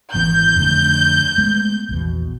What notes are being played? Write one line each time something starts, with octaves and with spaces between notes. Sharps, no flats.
G#1 E3 B3 G6
F2 D3 A3
G#3 A3 B3
A#1 E2 B2